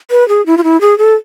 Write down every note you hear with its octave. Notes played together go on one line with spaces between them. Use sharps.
B4
G#4
E4
F4
E4
G#4
A4